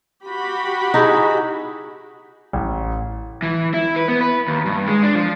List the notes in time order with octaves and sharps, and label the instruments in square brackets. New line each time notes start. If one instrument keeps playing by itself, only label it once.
[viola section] F#4 G4 B5
[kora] D#4 E4 G#4
[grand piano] A1
[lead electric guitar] E3
E4
B4
B3
B4
D#2
G2
G#3
D4
F3